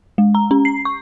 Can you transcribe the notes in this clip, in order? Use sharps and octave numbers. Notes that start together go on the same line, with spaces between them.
G#3
A#5
C#4
C7
C#6